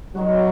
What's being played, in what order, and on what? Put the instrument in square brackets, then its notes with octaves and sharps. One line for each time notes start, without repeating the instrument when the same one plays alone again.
[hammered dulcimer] D#3 G#3 D#4 F#4 [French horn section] F#3